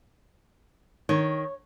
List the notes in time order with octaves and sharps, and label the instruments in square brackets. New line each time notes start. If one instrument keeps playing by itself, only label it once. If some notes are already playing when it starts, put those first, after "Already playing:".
[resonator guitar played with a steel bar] D#3 [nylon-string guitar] C#5